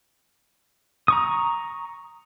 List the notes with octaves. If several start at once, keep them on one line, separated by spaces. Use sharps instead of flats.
A#5 C#6 D#6